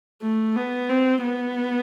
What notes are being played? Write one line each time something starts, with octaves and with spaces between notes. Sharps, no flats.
A3
B3
C4
B3